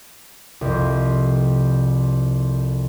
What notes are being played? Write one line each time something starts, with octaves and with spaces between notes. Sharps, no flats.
C2 F2